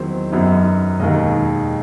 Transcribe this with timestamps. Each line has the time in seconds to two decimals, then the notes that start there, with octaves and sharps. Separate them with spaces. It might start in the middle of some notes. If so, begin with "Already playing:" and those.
Already playing: E2 D#3 F#3 C4 C5
0.32 F#2 F#3 B3 D#4
0.99 E1 D#2 D#3 D#5